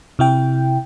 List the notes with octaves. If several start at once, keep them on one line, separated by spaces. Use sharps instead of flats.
C3 E4 G5